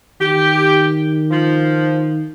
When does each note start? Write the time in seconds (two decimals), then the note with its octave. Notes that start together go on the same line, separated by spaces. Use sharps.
0.21 D#3 G4
1.31 F3